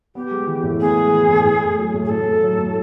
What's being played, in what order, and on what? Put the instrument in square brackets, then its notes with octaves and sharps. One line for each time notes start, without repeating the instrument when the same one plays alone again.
[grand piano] B3 [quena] G4
[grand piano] G#3
E3
A2
[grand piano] B3 [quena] G#4
[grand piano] G#3
E3
A2
A2
A3
F#3
A2
[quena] G#4
[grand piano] A2 [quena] A4
[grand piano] A3
F#3
A2